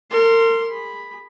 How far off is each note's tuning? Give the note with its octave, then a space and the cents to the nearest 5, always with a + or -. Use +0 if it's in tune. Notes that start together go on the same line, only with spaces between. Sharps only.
A#4 -35 C6 +0
G#4 -25 B5 +0